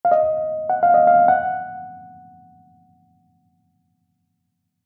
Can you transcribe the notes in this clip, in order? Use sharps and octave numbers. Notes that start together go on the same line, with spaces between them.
F5
D#5
F#5
F5
D#5
F5
F#5